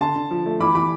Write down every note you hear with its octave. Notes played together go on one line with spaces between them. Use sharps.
D3 A5 C6
D3
F3
A3
E3 B5 D6
E3 B5 D6